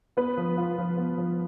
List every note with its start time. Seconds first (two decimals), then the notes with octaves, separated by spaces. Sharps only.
0.17 B3 B4
0.37 F3
0.57 F4
0.78 F3
0.98 B3
1.18 F3